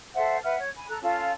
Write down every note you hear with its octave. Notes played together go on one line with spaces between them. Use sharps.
A4 C5 E5 F#5
B4 E5 F#5 F6
C#5
G#5 B5
A4 A#5 F#6
C#4 F4 A4 A5